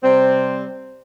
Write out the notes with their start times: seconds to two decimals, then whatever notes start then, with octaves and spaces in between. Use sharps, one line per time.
0.03 C3 G3 C4